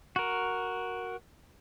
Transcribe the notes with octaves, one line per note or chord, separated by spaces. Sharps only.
F#4 A#4